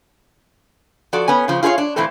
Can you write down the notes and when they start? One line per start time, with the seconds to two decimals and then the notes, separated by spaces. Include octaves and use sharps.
1.13 F3 F#4 A4 D5
1.28 B3 C#4 G#5
1.48 C#3 F3
1.63 F4 G#4 C5 C#5 F5
1.78 D4
1.96 A#2 E3 A3 C4 A4